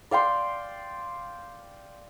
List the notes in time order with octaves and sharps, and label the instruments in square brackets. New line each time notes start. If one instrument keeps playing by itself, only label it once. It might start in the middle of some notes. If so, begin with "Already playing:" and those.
[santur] D5 F5 G5 C6